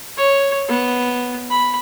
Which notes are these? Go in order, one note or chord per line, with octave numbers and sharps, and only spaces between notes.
C#5
B3
B5